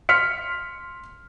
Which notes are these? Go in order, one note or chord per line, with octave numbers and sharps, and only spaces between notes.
C6 F6 B6 C#7